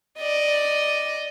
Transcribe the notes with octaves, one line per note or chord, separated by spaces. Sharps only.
D5 D#5